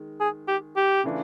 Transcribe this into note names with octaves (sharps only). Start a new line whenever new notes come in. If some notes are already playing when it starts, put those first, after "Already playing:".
Already playing: D#3 G#3
G#4
G4
G4
C#3 E3 A3 D4 F4